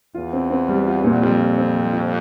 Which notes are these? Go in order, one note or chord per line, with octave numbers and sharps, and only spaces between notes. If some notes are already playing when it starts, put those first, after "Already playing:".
E2 F4
C4
C4
G3
F4
A#2
F2 G3
F4
C4
G3
F4